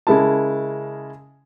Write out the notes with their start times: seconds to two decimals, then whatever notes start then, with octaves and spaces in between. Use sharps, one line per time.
0.07 C#3 G#3 E4 A#4 A5